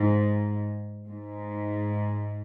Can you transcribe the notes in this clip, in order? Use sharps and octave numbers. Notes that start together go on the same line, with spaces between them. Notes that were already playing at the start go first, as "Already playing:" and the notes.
Already playing: G#2
G#2